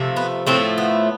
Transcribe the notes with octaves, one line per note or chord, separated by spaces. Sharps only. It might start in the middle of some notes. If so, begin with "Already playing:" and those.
Already playing: C3 F3 A3
B3
A2 F3 A3 C4
B3